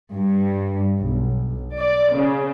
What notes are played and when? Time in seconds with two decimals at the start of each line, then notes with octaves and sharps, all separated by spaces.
0.14 G2
0.99 B1
1.76 D5
2.15 C#3